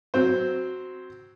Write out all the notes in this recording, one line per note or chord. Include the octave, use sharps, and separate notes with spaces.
F#3 C4 C5